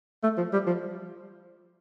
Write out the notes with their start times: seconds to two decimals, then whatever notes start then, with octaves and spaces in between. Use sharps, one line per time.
0.23 A3
0.38 F3
0.53 G3
0.67 F3